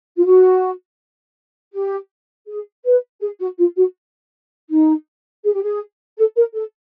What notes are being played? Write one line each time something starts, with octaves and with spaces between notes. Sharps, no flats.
F4
F#4
G4
G#4
B4
G#4
F#4
F4
F#4
D#4
G#4
G4
G#4
A4
A#4
A4